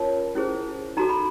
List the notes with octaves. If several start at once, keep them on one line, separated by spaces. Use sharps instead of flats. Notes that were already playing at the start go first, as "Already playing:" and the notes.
Already playing: C#4 F4 A#4 C#5 A5
C#4 E4 G#4 C5
D#4 F#4 A4 A#5
B5